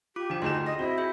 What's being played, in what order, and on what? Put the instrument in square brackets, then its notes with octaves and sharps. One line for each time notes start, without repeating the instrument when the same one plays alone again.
[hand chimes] F4 D6 [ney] G4
[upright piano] F3 E7 [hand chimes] D4 G5
[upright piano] D2 G#4 E7 [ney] D#4 [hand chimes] C6
[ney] D#5 [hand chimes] A#6
[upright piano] C4 D#5 [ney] E4 [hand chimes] F#4
[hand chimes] G#4 E5 G6